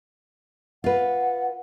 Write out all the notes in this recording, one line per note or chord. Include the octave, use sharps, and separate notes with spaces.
F4 B4 F#5